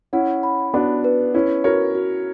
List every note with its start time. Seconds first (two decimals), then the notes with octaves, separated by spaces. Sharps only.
0.13 C#4 E4 F#5
0.43 B5
0.73 B3 D4 F#4
1.04 B4
1.34 C#4 E4 B4
1.64 F#4 A#4 C#5
1.95 F#4